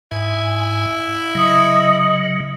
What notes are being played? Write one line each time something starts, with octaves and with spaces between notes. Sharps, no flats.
G#2 E4 G#5
C#3 F#3 D#5 D#6